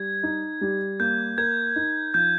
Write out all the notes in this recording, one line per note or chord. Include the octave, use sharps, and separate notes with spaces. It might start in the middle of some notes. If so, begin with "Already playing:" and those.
Already playing: G3 G#6
D#4
G3
A#3 G6
A#4 G#6
D#4
F3 G6